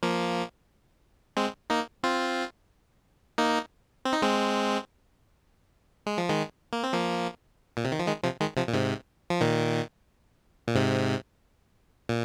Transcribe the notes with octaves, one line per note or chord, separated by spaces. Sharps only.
F3 A#3
G#3 C4
A#3 D#4
C4 F4
A#3 D#4
C4
D#4
G#3 C4
G#3
F3
D#3 G#3
A#3
C4
F3 A#3
A#2
C3
D#3
F3
D#3 G#3
C3 F3
D#3 G#3
C3 F3
A#2
G#2 C3
F3
A#2 D#3
A#2
G#2 C3
A#2